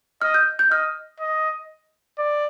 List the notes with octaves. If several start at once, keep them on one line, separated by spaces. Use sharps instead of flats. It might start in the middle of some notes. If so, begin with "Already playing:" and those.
D#5 F6
G6
G6
D#5 F6
D#5
D5